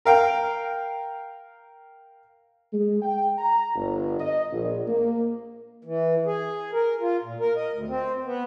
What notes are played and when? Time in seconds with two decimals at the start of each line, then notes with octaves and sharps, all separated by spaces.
0.05 A#4 F5 G5
2.73 G#3
3.02 G5
3.38 A#5
3.75 G1
4.19 D#5
4.51 A#1
4.87 A#3
5.85 E3
6.26 G#4
6.73 A#4
7.01 F4
7.23 A#2
7.40 A#4
7.56 D#5
7.72 D2
7.88 C4
8.24 B3